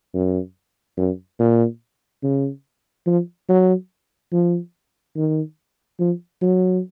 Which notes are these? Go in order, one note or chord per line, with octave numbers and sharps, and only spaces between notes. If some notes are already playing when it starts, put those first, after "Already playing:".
F#2
F#2
A#2
C#3
F3
F#3
F3
D#3
F3
F#3